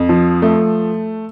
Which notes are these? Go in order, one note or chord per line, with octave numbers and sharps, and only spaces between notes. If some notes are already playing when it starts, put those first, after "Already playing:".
Already playing: F2
F3
A3